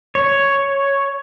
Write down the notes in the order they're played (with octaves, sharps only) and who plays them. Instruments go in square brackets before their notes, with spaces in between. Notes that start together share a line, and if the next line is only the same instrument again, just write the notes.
[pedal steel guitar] C#5